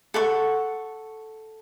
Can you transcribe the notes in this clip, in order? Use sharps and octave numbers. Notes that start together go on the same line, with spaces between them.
A4 F#5 C#6